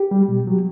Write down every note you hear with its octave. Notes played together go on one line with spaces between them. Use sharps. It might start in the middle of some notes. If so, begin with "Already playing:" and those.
Already playing: G4
G3
B2
F#3